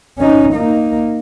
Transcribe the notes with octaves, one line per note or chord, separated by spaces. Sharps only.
C#4 D#4
A#3 D#4